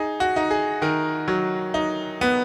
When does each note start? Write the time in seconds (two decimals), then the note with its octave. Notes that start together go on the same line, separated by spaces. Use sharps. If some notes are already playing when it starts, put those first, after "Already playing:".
Already playing: D#4 G#4
0.20 F#4
0.36 D#4
0.51 G#4
0.82 D#3 A#4
1.28 F#3
1.74 D#4
2.21 B3